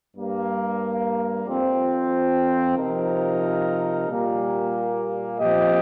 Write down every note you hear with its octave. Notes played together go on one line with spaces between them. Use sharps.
G2 G3 A#3
F2 F3 C4 F4
C3 F3 D#4 A#4
A#2 G3 A#3 G4
A#2 F3 C4 G4 D#5